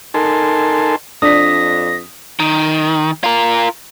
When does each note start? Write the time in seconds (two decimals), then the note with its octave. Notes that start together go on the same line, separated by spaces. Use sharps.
0.14 D#4 A4 A#4 G#5 A5 C6
1.22 F2 D4 D#6 A#6 B6
2.40 D#3
3.24 F4 A#4